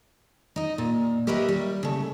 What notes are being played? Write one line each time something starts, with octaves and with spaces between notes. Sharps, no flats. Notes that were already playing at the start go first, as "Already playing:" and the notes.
D#4 D#5
A#2
G4 A#4 B4 C#5 D#5 E5
G3
C#3 A3